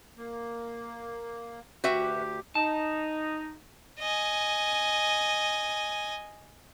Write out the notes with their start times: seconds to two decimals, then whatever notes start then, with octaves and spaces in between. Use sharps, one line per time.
0.17 A#3
1.84 D2 F#4 G4 B4 E5
2.55 D#4 A5
4.00 D#5 G#5